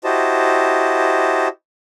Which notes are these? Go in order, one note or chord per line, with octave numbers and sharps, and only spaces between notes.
E4 F#4 G4 C5 D#5 A5